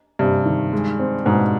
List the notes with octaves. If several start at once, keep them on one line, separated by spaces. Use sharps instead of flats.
G2 C3
D#3
G#3
C4
G#2 B2